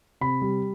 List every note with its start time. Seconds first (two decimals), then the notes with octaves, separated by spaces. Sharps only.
0.21 C3 B5
0.42 G3